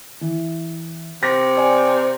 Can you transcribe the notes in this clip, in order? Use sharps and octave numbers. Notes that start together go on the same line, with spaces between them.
E3
C3 A#6
D5 G#5